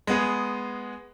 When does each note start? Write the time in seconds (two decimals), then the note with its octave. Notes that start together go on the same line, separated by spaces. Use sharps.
0.07 G#3 B3 G#4